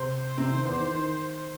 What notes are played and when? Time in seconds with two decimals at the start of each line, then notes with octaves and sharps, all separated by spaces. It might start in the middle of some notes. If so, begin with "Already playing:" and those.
Already playing: C3 C4 C5
0.38 C3 C4
0.52 D#3
0.65 E2 E3
0.79 D#3
0.93 D#3